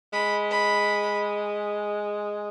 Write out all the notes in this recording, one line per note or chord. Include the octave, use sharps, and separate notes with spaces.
G#3 B5
B5